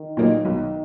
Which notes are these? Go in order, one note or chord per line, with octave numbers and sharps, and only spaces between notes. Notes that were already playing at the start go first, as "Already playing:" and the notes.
Already playing: D#3
A#2 F#3 A#3 D#4
B1